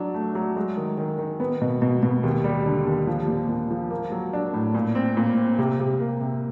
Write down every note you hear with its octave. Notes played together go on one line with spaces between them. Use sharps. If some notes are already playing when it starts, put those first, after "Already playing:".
Already playing: F#3 D4
A3
F#3
G#3
D#3
D#3
D#3
B3
B2
B2
B2
D#2
G3
D3
D#2
F3
A#2
A#2
F3
A#3
F#3
D4
A2
A#2
C4
A#2
C4
C3
C3
A#3
C3